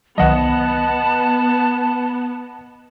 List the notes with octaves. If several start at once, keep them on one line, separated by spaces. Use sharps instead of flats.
C2 D#3 F#3 B3 D#5 F#5 A5